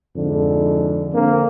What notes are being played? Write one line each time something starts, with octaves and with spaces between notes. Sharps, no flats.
F2 G#2 D3
D3 A#3 C4